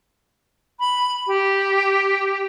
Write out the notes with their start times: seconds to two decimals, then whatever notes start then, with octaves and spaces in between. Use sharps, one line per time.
0.80 B5
1.27 G4